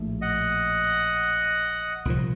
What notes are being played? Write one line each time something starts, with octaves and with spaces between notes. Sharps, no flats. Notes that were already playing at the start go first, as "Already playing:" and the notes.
Already playing: A#1 A2 A3
D#5 F#5
C2 A#2 F3